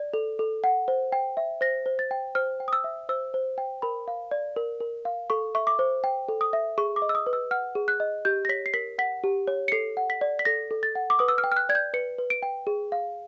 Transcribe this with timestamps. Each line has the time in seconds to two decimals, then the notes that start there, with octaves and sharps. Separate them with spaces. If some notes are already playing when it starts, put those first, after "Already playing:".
Already playing: D5
0.14 A4
0.39 A4
0.64 F#5
0.88 C5
1.12 G5
1.37 E5
1.61 C5 A#6
1.86 C5
1.99 A6
2.11 G5
2.35 C5 F6
2.60 G5
2.68 D#6
2.73 E6
2.84 E5
3.09 C5 E6
3.34 C5
3.58 G5
3.82 A#4 B5
4.08 F5
4.31 D5
4.56 A#4
4.80 A#4
5.05 F5
5.30 A4 C#6
5.55 E5 C#6
5.67 D6
5.79 C5
6.04 G5
6.29 A4
6.41 D#6
6.53 E5
6.78 G#4 C#6
6.96 D6
7.02 D#5
7.09 E6
7.15 D#6
7.26 B4
7.33 E6
7.51 F#5 F6
7.75 G#4
7.88 F#6
8.00 D#5
8.25 G4 G6
8.45 A#6
8.49 C#5 B6
8.66 C7
8.74 A#4 B6
8.98 F#5 B6
9.24 G4
9.48 C#5
9.68 C#7
9.72 A4 C7
9.97 F#5
10.10 B6
10.21 D5
10.39 B6
10.45 A4 A#6
10.71 A4
10.83 A6
10.95 F#5
11.10 D6
11.19 B4 D#6
11.28 E6
11.38 F6
11.44 G5
11.52 F6
11.57 F#6
11.69 D5 G#6
11.75 G6
11.94 B4 C#7
12.18 B4
12.30 D7
12.43 G5
12.67 G#4
12.92 F5